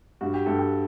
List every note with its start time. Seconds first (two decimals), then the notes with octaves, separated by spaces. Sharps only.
0.21 G2 F#4
0.34 G4
0.46 G2 A4
0.59 G4